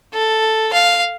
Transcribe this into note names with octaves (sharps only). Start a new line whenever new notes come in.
A4
F5